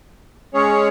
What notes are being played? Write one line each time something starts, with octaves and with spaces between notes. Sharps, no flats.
G#3 C#4 G#4 C#5